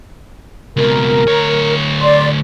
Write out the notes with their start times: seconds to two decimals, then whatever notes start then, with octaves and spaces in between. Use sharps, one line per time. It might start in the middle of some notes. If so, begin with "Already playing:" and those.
0.77 C#2 B2 A#4
1.28 D2 C#5
2.01 D5 C6